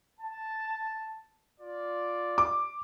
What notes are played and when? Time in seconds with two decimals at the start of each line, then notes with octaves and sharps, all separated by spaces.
0.19 A5
1.59 F4 D5
2.38 D6